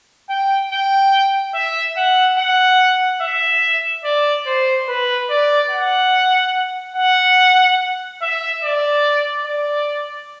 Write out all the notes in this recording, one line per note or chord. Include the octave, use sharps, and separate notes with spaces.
G5
G5
E5
F#5
F#5
E5
D5
C5
B4
D5
F#5
F#5
E5
D5
D5